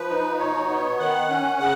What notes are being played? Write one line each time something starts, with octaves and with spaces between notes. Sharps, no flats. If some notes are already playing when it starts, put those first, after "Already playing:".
Already playing: F3 B4
D#4
B2 C#5
B3
D#3 F#5
C#4
C#3 F#5